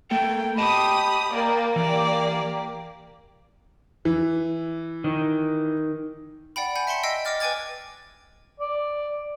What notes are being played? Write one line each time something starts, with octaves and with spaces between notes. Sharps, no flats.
A3 A#3 A4 G5
G4 D#5 A5 B5 D#6
A#3 D5 G5
E3 A#3 G4 D5
E3
D#3
D5 F#5 G5 B5
F#5 G#5 B5 G6
E5 A5 C6 C#7
D#5 G5 E6 B6 C7
D#5 G5 D6 F6 A6
B4 G5 G#5 D6 G#6 A6
D5